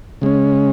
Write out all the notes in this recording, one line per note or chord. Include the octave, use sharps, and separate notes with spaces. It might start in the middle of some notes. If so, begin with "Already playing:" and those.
C#3 G#3 C#4